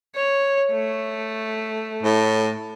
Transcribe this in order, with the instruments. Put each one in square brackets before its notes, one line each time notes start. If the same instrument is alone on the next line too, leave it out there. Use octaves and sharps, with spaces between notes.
[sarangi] C#5
A3
[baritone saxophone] A2